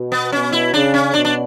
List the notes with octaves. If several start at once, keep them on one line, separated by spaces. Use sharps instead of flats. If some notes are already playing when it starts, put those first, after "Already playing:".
Already playing: B2
B3
B2 C#4
E4
C#3 D4
C#4
B2 D4
D4